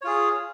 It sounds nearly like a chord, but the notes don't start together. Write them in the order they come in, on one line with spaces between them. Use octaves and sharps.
C#5 F4 G#4